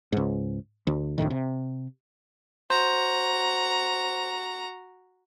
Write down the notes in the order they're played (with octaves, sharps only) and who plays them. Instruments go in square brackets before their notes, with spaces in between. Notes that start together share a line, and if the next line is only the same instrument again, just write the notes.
[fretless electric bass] C#2 G#2
D2
F1 D2 A2 D#3
C3
[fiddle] F#4 A#5 [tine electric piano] C5